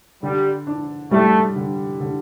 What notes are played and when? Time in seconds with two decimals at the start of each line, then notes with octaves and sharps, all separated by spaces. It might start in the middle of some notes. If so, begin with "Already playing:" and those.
0.23 D3 G3
0.67 D4
1.11 G3 A3
1.56 D3
2.00 D3